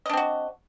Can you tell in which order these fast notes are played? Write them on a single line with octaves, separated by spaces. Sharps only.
D#5 D4 C4 F#4